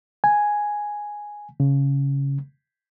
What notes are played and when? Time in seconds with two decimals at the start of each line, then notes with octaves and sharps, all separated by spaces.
0.24 G#5
1.60 C#3